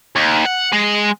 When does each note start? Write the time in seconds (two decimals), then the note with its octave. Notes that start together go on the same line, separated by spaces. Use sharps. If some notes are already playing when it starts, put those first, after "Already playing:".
0.16 D#2
0.46 F#5
0.73 G#3